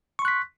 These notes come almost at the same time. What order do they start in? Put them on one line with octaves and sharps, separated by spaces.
C#6 C6 F#6 B6